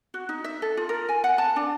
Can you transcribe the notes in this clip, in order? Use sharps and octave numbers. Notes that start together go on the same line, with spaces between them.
F#4
D#4
E5
A4
F4
A#4
G#5
F#5
A5
D4